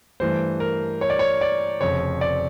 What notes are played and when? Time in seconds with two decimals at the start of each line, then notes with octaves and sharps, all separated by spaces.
0.20 G2 E3 A3 C5
0.60 A#4
1.01 C#5
1.10 D5
1.19 C#5
1.41 D5
1.81 F1 F2 C#3 C#5
2.21 D5